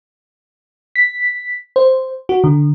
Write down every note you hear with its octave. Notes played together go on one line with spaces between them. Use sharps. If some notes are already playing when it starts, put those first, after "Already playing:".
B6
C5
F#4
D3